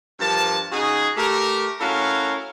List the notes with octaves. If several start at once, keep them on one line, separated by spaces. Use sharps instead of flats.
G2 F3 G3 A#4 A5
C#3 D#4 F#4 G#4
A3 G4 A#4
A3 C#4 E4 F#4 A#4 F5